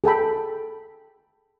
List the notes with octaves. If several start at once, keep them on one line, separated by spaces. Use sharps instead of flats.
G#4 A4 G5 B5